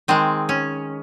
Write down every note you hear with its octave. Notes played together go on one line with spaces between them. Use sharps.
D#3 G#3 C4
C#4